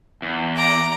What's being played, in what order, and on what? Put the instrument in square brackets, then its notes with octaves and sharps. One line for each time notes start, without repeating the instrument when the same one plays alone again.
[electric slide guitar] E2
[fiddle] A#5 D6